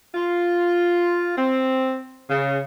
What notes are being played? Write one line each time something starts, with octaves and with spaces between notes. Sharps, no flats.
F4
C4
C#3